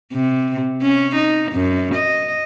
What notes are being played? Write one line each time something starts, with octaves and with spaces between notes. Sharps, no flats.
C3
C#4
D#4
F#2
D#5